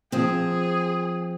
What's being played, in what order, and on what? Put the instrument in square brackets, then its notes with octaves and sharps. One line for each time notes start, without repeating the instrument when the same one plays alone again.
[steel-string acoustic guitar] F3 C4 [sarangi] G#4